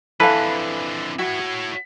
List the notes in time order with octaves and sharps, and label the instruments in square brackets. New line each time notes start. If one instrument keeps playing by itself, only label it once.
[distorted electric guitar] F2 D3 [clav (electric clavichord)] E3 B4 [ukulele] A4 F5
[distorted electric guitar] E4 C#5 [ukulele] F#4